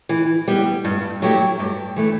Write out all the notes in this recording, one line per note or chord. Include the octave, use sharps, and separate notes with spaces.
E3
G3 B3
G2
F#3 A3 E4 G4
G2
E3 A3 D4